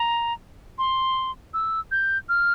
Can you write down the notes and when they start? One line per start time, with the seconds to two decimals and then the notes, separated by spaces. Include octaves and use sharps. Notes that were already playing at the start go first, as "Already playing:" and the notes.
Already playing: A#5
0.78 C6
1.54 E6
1.91 G6
2.29 F6